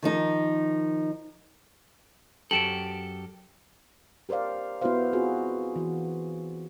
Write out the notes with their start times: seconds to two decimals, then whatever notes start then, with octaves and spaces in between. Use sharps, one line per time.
0.02 D#3 F3 D#4
2.51 F#2 G4 A4 D7 E7 F#7
4.29 G4 A#4 C5 D5 F5
4.81 B3 E4 F#4 B4 C5 F5
5.13 C4 F4 F#4 G#4
5.76 E3 F#4